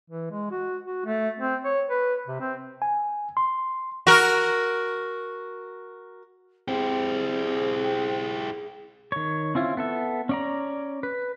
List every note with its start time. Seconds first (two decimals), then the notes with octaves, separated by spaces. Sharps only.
0.10 E3
0.30 G#3
0.51 F#4
0.85 F#4
1.05 A3
1.40 C4
1.65 C#5
1.90 B4
2.27 C3
2.40 C4
2.82 G#5
3.37 C6
4.07 F#4 A#4
6.68 C4 E4 G4 G#4
9.12 D#3 C#5
9.55 C4 C#4 E4 F4
9.77 B3 A4 E5
10.29 C#4 D5 A#5
11.03 B4